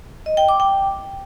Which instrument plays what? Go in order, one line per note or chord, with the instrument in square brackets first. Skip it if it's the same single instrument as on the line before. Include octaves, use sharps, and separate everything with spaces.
[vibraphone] D#5
G5
D6
G5